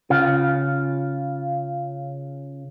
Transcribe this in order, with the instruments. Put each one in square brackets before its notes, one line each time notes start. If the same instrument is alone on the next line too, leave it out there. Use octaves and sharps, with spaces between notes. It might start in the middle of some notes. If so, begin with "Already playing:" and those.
[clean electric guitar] C#3 F4